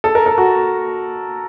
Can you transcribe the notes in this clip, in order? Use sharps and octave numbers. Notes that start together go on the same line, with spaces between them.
A4
A#4
A4
F#4